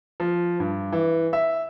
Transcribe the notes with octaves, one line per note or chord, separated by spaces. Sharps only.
F3
G2
E3
E5